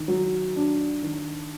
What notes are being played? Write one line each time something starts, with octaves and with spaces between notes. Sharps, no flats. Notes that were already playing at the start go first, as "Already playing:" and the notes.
Already playing: D#3
F#3
D4
D#3